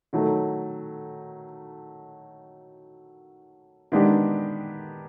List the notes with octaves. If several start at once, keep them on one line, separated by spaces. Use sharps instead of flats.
D#3 F#3 A3
D#3 G#3 B3 D4 G4